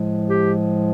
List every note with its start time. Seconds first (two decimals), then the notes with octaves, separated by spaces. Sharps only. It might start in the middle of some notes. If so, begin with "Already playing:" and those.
Already playing: A2 F3 G#3
0.28 G4